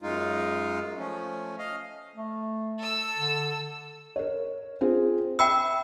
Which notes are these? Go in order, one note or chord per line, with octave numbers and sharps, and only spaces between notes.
F#2 G#3 D#4 F4
F3 A3 C#4
D#5 F5
A3
A4 E6
D3
A#4 C#5
C4 F4 G#4
E5 G5 B5 E6 C#7